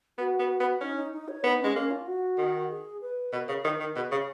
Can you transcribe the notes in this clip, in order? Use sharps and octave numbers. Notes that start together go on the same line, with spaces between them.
B3 F#4
B3
B3
C#4 D#4
D#4
D#4
C#5
B3 D#4
G#3 C#4
A#3 C#4
F4
F#4
D#3
G#4
B4
B2 A#4
C#3
D#3
D#3
B2 G#4
C#3 G#4